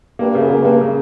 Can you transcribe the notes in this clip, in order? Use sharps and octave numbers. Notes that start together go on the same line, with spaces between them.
G2 A#3
F#2 C#3
A#3
G2 A#3
C#3